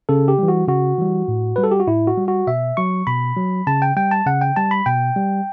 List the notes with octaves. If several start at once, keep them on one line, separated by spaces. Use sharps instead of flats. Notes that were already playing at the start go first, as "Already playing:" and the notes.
C#3 A4
G4
E3 G3
F#4
C#3 F#4
E3 G3
A2
G3 B4
A4
G4
F#4
A2 E4
F#4
G3
F#4
B2 E5
F#3 C#6
B2 B5
F#3
C#3 A5
G5
G3 G5
A5
C#3 F#5
G5
G3 A5
B5
B2 G5
G3